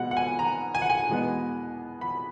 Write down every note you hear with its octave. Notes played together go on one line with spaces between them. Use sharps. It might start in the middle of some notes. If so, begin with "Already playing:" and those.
Already playing: B2 G#3 B3 F#5
F#5
G#5
A#5
G#5
F#5
G#5
E2 B2 G#3 B3
B5